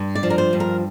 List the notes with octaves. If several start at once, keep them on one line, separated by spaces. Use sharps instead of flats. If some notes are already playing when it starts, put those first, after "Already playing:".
Already playing: G2
D5
F3
A#4
C5
G2
A#4